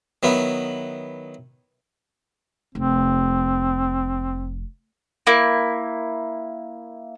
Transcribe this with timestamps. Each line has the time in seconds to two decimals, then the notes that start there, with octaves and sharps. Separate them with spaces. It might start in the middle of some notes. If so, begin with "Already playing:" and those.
0.23 D#3 F#3 B3 E4
2.75 F1 C4
5.27 A#3 E4